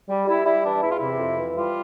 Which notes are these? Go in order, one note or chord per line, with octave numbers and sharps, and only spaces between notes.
G3
G3 E4
G3 E4
E3 D4
E2 E4
F4
C3 E4
F2
E3
G3 F4